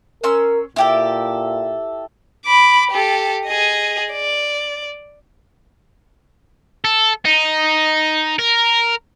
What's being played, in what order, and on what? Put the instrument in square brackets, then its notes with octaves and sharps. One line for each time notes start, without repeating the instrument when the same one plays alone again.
[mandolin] C#4 C6 E6 [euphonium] A#4
[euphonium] A#2 [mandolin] E4 G4 A4
[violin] B5 D6
G4 A4
G#4 D#5
D5
[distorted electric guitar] A4
D#4
A#4